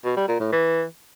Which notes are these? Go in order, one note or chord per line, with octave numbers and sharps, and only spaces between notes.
B2
G3
A#2
A2
E3